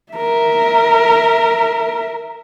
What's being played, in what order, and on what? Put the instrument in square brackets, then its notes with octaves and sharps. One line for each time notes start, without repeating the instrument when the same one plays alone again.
[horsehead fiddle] A#4 E5